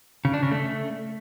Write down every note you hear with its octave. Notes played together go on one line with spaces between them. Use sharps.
C#3
D4
C#3
A3